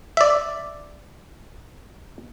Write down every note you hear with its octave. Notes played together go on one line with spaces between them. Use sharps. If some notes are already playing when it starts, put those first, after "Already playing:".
D5 E5